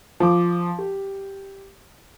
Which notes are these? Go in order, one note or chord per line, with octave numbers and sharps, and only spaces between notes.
F3 D6
G4